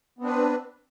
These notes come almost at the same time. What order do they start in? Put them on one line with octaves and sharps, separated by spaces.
B3 C4 D4 B4